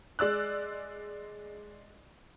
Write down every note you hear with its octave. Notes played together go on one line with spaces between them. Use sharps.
G#3 D5 E6 F#6